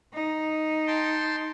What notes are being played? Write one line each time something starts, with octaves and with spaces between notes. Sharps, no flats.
D#4
G5 A5 C6